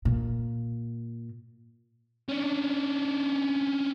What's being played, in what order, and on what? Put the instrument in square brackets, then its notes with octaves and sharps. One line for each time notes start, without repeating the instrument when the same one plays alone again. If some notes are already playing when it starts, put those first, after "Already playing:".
[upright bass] A#2
[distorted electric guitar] C#4 D4